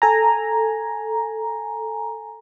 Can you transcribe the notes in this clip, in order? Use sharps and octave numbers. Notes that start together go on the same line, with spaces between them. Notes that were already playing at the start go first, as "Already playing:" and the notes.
A4 G#5 A#5